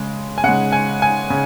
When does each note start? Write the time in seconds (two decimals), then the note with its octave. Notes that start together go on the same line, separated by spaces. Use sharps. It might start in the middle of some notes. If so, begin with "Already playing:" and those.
Already playing: C#3 G#3
0.38 G#5
0.44 C#3 G#3 F#5
0.72 G#5
1.02 G#5
1.30 C#3